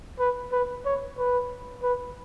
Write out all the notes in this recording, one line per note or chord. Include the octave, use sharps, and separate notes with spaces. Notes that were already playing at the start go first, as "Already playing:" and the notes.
B4
B4
C#5
B4
B4